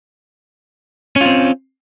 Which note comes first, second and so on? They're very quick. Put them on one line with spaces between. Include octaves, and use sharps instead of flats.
C#4 F4 C4